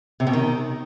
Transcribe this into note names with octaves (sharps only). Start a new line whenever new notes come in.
C3
B2
D#3